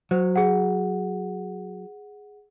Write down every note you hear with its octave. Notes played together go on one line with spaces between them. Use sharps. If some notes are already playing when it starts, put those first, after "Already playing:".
F#3 C5
G#4 F#5